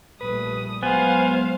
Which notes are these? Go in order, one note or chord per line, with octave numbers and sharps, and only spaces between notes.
A#1 G3 A3 B4 D#6
F#3 G#3 B3 C5 F5 G#5